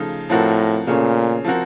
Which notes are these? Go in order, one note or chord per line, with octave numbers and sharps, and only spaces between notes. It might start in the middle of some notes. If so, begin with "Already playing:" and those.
Already playing: C#3 F3 A3 D#4
A2 F3 C4 F#4 A#4
A#2 C#3 A3 C#4
F3 C4 F#4 A#4